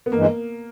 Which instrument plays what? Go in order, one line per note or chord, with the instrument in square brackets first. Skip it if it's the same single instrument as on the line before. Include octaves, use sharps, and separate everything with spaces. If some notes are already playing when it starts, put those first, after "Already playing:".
[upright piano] B3
[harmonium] G2 E3 G#3 [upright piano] A#3